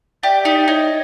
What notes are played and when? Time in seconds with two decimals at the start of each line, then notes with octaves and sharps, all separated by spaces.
0.23 G4 D5 E5
0.45 D#4
0.68 D#4 C#5 D#5